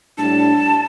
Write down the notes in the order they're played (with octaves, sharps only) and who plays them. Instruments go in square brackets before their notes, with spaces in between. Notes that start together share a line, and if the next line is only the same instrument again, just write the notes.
[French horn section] A2 G3 D4 [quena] A5